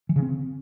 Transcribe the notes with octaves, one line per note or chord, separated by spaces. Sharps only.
E3
C#3
C4